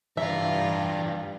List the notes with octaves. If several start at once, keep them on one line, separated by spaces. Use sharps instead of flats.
G2 E3 G3 F4 E5 A#5